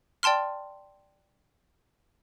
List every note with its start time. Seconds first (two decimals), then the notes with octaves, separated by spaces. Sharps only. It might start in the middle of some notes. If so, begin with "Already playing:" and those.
0.23 D5 G5 A5 C6 F6